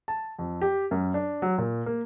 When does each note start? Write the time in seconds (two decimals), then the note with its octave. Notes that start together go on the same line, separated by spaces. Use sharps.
0.08 A5
0.39 F2
0.61 G4
0.91 F#2
1.14 D4
1.42 F#3
1.58 A#2
1.86 A#3